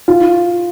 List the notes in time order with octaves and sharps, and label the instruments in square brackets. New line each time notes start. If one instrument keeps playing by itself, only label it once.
[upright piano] F4